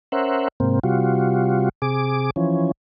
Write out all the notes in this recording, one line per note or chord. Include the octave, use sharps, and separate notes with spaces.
C#4 A#4 C5 E5 F#5
G#2 C3 A#3 C4
C3 G3 F4 F#4
C3 G#4 D6
E3 F3 C#4